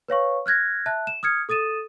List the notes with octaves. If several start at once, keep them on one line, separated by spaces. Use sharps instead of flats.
B4 C#5 F5 C#6
F6 F#6 G#6 A#6
E5 A5 F#6
E7
D#6 F6 G#6 C#7
A4 D#6 A6 D#7 E7